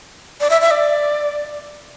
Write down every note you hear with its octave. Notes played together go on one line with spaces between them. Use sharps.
D5
E5
E5
D5